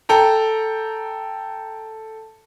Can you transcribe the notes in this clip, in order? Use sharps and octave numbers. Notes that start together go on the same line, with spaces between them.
A4 G5 A#5